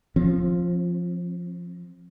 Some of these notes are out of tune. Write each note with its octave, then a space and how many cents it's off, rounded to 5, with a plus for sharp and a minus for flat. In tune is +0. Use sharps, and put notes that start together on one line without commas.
F3 +0 C4 +30